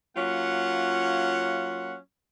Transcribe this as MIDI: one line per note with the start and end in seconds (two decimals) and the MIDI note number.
0.16 1.96 54
0.16 1.96 58
0.16 1.96 61
0.16 1.96 65
0.16 1.96 78